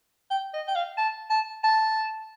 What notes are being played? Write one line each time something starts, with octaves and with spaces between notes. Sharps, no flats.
G5
D#5
G5
F5
A5
A5
A5